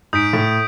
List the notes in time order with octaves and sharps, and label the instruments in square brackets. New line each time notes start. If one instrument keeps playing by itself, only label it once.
[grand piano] G#2 [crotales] D#6 G6 B6 D7
[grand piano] A2